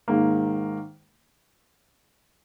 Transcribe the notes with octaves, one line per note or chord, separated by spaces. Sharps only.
G#2 D#3 A#3